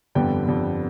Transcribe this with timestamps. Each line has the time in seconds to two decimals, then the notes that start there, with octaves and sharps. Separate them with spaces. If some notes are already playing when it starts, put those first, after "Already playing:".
0.15 G1 F2 D3 G3 B3 G5
0.46 G1 F2 D3 G3 B3